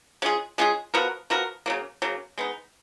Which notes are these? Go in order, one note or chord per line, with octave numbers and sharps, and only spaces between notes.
G#3 C#4 F4 G#4
G#3 C#4 F4 G#4
F3 B3 F#4 A#4
F3 B3 F#4 A#4
C#3 F#3 A#3
C#3 F#3 A#3
G#3 B3 D#4